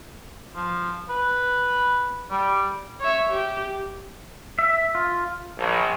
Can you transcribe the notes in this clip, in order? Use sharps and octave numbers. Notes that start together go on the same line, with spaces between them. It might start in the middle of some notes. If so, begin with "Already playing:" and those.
F3
B4
G3
C#5 E5
G4
E5
F4
A#1